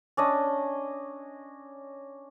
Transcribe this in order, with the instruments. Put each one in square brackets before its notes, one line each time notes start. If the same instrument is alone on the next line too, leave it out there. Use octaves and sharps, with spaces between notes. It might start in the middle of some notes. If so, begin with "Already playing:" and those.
[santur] C#4 D4 D#5